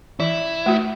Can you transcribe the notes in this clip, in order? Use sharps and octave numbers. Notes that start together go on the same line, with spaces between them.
E3 E4
A3 F#4